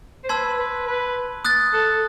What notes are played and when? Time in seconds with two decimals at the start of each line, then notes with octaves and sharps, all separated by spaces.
0.24 C5
0.29 B4 A5 C6 E6 G#6
0.59 B4
0.87 B4
1.45 D#6 F#6 A6
1.74 A4